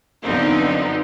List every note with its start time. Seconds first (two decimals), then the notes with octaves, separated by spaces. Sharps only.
0.23 F#2 D3 F3 B3 C4 D#4